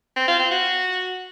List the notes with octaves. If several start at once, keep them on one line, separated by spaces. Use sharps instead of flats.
C4
F4
C4
F#4